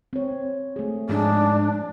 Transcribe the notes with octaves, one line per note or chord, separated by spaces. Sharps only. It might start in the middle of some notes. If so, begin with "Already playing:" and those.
C4 C#5
A3 G#4
G#2 F3 D4 D#4 G#4